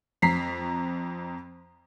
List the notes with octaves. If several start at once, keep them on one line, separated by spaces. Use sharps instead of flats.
F2 A#5 B6 C7